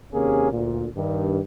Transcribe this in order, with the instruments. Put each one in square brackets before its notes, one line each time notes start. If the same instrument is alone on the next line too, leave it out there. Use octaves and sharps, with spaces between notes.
[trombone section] D#2 C3 A#3 C#4 G#4
D2 A#2
G2 D#3